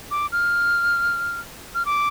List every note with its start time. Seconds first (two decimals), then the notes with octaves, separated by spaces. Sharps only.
0.11 D6
0.32 F6
1.75 F6
1.85 D6